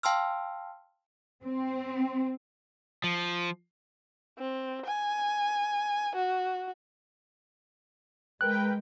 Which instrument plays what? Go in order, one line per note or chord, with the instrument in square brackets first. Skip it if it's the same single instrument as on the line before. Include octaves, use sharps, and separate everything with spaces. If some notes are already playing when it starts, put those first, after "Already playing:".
[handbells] F5 G5 A5 C6 E6 F6
[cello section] C4
[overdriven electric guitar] F3
[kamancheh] C4
G#5
F#4
[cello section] G#3 [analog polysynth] A#4 B4 G5 [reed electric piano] F#6